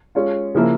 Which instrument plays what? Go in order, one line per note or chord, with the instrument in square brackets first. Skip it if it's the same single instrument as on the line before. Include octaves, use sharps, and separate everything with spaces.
[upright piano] G#3 C#4 F4
C#3 F3 A#3 E4